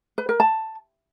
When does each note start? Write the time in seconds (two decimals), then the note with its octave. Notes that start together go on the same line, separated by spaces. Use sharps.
0.18 B4
0.29 A#4
0.40 A5